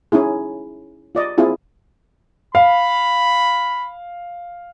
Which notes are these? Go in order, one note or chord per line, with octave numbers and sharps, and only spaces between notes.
C#4 D#4 E4 G#4
F4 D5 D#5
C4 E4 F4 G#4
F5 B5